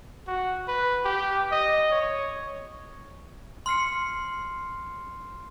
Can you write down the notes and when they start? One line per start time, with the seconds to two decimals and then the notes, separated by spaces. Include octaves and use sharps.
0.27 F#4
0.68 B4
1.05 G4
1.52 D#5
1.91 C#5
3.66 C6 F6 C7 C#7